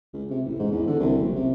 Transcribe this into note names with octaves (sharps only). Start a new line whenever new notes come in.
C#2
C3
A1
G#2
E2
D3
C2
F#1
C3